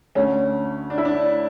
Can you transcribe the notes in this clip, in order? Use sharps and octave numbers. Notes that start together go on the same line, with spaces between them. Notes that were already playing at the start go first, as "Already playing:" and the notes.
D2 D3 C#4
D4
E4
D4